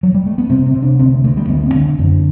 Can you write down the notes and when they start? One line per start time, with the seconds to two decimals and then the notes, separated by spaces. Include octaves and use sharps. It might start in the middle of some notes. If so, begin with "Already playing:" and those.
0.03 F#3
0.14 G3
0.27 A3
0.38 B3
0.50 C3 C4
0.66 C4
0.74 C3
0.82 D4
0.99 D2 C4
1.24 D2 A3
1.37 G3
1.49 D3 B3
1.66 C4
1.74 D3
1.99 F#2 D3